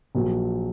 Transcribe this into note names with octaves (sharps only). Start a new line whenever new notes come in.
A#1 A#2 F#3